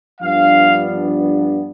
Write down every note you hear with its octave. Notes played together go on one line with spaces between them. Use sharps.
G2 F3 B3 D4 F5